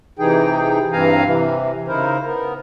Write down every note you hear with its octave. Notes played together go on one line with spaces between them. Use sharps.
C3 E3 D#4 G#4 G5
G2 E3 C4 F5 G#5 A#5
C3 E3
C#3 D#4 E4 A#4 C5
B3 A#4